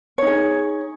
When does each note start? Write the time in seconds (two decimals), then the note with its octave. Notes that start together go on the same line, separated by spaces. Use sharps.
0.18 C#5
0.23 D#4
0.27 G#4